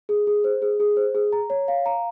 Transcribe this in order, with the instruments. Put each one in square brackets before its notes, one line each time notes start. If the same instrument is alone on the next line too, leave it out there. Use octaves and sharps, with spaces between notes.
[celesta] G#4
G#4
C5
G#4
G#4
C5
G#4
A#5
C#5
F5
A#5